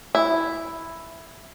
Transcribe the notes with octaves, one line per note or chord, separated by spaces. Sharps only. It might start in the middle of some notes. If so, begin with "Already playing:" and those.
E4